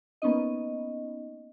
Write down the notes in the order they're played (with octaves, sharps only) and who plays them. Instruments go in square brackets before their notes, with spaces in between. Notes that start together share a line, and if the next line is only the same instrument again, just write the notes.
[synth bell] A#3 B3 C#4 D#4 D#5